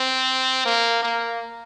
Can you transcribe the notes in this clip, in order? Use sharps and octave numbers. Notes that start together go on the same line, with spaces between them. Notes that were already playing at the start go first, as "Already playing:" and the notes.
Already playing: C4
A#3
A#3